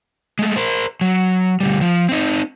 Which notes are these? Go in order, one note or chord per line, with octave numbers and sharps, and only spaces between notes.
G#3 A3
A#4 C5
F#3
D2 G3
F3
C4 D#4